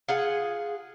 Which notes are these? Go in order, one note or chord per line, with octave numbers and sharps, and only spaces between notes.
F4 G#4 F#5